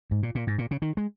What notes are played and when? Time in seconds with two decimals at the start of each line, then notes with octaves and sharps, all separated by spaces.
0.11 G#2
0.23 A#2
0.35 A#2
0.47 G#2
0.58 A#2
0.71 C#3
0.82 D#3
0.97 G#3